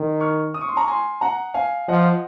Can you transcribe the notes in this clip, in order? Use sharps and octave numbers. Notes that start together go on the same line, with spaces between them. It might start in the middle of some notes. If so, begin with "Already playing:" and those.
Already playing: D#3
C#6 F6
D#6
C#6
C6
A#5 C#6
G#5 C6
F#5 A#5
F5 G#5
F3 D#5 F#5